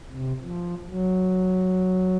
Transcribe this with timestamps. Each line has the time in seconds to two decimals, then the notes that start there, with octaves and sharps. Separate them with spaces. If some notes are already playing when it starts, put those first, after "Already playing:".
0.12 C3
0.43 F3
0.89 F#3